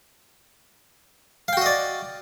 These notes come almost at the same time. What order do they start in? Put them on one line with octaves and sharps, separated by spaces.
F5 G5 F#4 D#5 D5